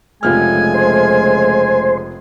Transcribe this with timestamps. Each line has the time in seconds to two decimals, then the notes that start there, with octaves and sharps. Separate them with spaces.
0.23 F1 C#3 F3 G#3 A3 G#5 F6
0.74 C5